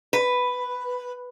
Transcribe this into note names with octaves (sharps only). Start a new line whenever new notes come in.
B4